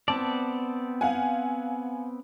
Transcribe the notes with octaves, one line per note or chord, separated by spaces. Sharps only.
B3 C4 D5 A5
F5 F#5 G#5